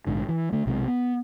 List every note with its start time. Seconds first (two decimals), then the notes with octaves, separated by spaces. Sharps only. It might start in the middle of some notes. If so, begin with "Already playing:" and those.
0.07 A#1 G#2 D3
0.29 E3
0.52 D3 A3
0.66 B1 C3 G#3
0.87 B3